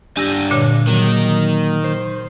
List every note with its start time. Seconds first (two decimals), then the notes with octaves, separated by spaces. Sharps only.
0.17 G2 D4 G4 G#5 E6 A#6
0.51 A#2 D3 C#5
0.87 D#3 F#3 A#3
1.84 C5